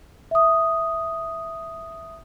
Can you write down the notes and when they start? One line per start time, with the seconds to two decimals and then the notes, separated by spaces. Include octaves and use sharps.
0.31 E5 D#6